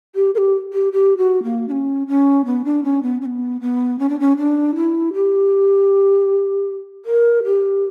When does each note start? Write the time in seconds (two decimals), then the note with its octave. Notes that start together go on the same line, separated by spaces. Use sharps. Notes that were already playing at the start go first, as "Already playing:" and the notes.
0.15 G4
0.35 A#4
0.38 G4
0.73 G4
0.93 G4
1.17 F#4
1.43 A#3
1.68 D4
1.72 C#4
2.08 C#4
2.45 B3
2.65 D4
2.84 C#4
3.03 B3
3.21 C#4
3.26 B3
3.61 B3
3.99 C#4
4.09 D4
4.20 C#4
4.37 D4
4.76 E4
5.14 G4
7.05 A#4
7.44 G4